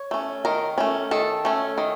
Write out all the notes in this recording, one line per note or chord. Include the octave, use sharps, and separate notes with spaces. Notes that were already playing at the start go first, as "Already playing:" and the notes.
Already playing: C#5
A3 C#4
D#3 A#4
A3 C#4
D#3 A4
A3 C#4
D#3